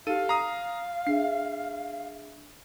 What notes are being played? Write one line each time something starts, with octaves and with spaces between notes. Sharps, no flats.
D#4 G4 A4 F5 D#7
A#5 D#6 C7
D4 G#4 E5 C7